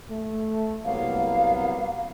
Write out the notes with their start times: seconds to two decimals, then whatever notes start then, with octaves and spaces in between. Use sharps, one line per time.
0.10 A3
0.85 C2 F#3 A#3 B3 F5